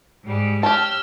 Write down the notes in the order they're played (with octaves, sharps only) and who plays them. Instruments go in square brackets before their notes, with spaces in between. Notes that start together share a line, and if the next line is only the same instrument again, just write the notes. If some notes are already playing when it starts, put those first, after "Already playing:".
[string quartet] G#2 G3
[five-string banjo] G4 C#5 A5 [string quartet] E6 F6 G6